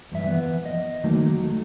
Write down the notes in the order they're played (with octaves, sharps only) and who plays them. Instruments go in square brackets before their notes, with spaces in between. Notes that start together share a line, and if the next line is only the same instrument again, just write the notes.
[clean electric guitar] E2 G2 E5
E3 F3 B3
D#5
E2 D#3 F#3 A3 A#3
F#3
A3